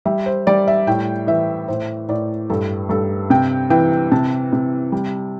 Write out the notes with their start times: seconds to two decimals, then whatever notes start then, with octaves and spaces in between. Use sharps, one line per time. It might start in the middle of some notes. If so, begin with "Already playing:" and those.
0.05 G3 E5
0.26 C5
0.47 G3 D5
0.67 E5
0.87 A2 G5
1.27 E3 E5
1.68 A2 C5
2.08 A2 D5
2.50 G2 A4
2.89 G2 A4
3.30 C3 G5
3.70 E3 G5
4.12 C3 A5
4.53 C3
4.92 G3